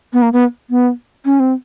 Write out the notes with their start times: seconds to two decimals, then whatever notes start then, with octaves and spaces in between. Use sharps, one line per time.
0.13 B3
0.22 A#3
0.33 B3
0.70 B3
1.25 C#4
1.40 C4